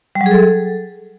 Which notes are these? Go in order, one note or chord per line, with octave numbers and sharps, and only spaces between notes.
G3
F#3
G#4
A4